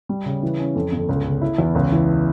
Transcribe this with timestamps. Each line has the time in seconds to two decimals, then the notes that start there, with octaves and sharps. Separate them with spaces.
0.09 G3
0.26 C#3
0.42 E3
0.59 C#4
0.76 F2
0.92 G1
1.09 C#2
1.25 C#3
1.42 E4
1.58 E2
1.75 C#2
1.91 E3